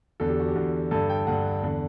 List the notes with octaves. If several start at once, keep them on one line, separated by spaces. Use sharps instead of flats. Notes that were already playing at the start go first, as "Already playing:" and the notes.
E2 D3 A4
G4
F#4
G4
E2 D3
G2 D3 A4
G5
G2 D3 F#5
E2 D3